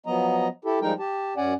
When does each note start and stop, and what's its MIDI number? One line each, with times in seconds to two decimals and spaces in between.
0.06 0.48 53
0.06 0.48 54
0.06 0.48 59
0.06 0.48 75
0.06 0.48 82
0.65 0.79 64
0.65 0.79 67
0.65 0.79 69
0.82 0.93 53
0.82 0.93 55
0.82 0.93 56
0.82 0.93 63
0.82 0.93 70
0.82 0.93 79
0.99 1.34 67
0.99 1.34 81
1.37 1.54 42
1.37 1.54 61
1.37 1.54 74
1.37 1.54 78
1.37 1.54 80